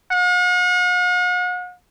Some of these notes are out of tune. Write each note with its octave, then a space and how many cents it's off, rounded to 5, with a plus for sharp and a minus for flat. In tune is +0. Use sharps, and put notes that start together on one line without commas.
F#5 -45